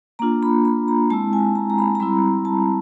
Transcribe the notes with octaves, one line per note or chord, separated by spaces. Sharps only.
A#3 D4 F4 A#5
B5
B5
A#5
G#3 C4 E4 A5
G#5
A#5
A#5
B5
A#5
G3 C4 E4 B5
A5